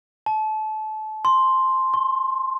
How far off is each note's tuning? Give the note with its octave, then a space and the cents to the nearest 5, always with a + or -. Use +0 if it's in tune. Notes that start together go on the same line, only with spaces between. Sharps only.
A5 -25
C6 +5
C6 +45